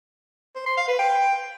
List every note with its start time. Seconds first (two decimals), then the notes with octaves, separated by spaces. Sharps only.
0.56 C5
0.66 C6
0.77 F5
0.88 B4
0.99 G5